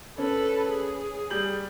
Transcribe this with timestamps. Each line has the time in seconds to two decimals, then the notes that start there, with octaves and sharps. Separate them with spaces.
0.18 C#4 A4 B4
0.70 G#4
1.30 G3 G6 F#7